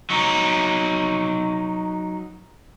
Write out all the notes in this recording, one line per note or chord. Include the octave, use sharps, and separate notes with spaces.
F#3 D#4